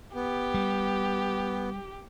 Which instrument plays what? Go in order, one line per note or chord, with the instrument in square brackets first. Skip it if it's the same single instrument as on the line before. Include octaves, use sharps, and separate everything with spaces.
[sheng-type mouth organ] B3 [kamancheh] G4
[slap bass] G3